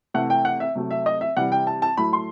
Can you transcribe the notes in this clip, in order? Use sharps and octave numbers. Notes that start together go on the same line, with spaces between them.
C3 E3 A3 F#5
G5
F#5
E5
C3 F#3 A3
E5
D#5
E5
C3 E3 G3 F#5
G5
A5
A5
A2 F#3 A3 B5
C6